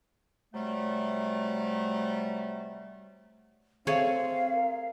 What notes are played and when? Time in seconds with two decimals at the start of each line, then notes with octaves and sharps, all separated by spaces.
0.54 C3 F#3 G3 A3
3.87 A3 C4 G#4 C#5 F5
4.55 A#4